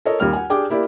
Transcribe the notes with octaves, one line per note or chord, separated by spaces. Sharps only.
A4 A#4 C#5 D#5
D#2 G3 F6
F#5 G#5
D4 G4 G#4 G5 D6
A#3 E4 G4 D5